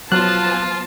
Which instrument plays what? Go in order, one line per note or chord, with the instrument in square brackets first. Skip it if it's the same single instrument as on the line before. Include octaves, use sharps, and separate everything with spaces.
[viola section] F3 B3 A5 [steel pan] F#3 [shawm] F4 [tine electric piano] F#6